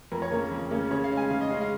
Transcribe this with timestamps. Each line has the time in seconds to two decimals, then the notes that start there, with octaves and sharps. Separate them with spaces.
0.12 F2 A#4
0.22 C#5
0.31 C#3 A#3 C#4 A#4
0.51 F2
0.71 C#3 A#3 C#4
0.91 C#3 C#5
1.04 F5
1.11 G#3 C#4
1.17 G#5
1.31 C#3 F5
1.41 D#5
1.51 C#4 F5
1.53 G#3
1.61 F5